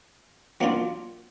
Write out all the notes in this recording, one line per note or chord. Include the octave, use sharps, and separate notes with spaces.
F#3 A#3 D4 F4